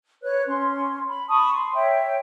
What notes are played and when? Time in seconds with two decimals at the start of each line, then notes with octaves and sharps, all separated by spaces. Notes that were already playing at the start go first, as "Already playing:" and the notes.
0.23 B4 C#5 F#6
0.47 C#4 C6
1.07 B5
1.29 A5 B5 C#6 D#6
1.55 C6
1.74 C#5 E5 G5